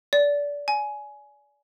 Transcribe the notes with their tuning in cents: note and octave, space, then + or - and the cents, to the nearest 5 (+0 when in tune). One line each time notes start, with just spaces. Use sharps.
D5 -25
G#5 +15